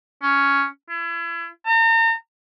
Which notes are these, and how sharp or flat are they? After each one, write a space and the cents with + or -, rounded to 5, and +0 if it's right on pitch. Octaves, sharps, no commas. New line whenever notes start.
C#4 +5
E4 +35
A#5 -40